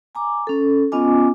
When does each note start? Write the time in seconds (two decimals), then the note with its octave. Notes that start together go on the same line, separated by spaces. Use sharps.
0.15 G#5 A#5 D6
0.47 C#4 A4
0.92 B3 C#4 F4 D#5 G#5 D6